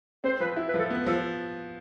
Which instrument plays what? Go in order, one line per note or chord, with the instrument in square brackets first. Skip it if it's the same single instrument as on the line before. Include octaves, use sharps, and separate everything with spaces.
[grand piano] C4 [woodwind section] C5
[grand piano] F3 [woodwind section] B4
[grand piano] E4
[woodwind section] B4
[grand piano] F3 [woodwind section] A4
[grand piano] B3
[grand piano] F3 [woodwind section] A4